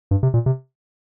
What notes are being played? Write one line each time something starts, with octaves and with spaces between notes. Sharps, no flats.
G2
C3
A#2
C3